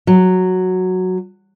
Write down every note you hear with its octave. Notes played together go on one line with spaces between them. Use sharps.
F#3